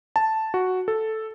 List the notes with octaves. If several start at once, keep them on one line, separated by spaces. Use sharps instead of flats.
A5
F#4
A4